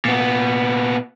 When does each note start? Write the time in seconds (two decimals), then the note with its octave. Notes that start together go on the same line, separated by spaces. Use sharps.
0.05 A#2 B3